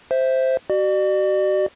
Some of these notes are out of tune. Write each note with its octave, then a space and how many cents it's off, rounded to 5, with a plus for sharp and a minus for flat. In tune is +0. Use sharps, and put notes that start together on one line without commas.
C5 +0 E5 -5
F#4 +40 D5 +40